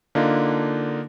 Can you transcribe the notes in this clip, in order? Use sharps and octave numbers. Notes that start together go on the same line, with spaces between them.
D3 A#3 D4 D#4 F4